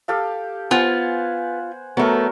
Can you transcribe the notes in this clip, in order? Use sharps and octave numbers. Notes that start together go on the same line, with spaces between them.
G4 A4 F5
B3 F4 C5 F#5 G#5
F#3 A3 B3 A#4